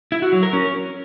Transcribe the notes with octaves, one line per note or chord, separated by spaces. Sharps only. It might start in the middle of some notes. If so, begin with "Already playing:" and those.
E4
F#4
F#3
A#4
C#4